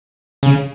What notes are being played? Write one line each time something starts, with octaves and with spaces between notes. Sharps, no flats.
C#3